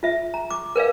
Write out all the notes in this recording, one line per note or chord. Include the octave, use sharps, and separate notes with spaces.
F4 E5
A#5
D6
A#4 B4 D5 F5